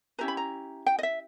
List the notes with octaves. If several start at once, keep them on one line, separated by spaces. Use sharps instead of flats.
C#4 E4 G4 B4 A#5
B5
A#5
G5
D#5
E5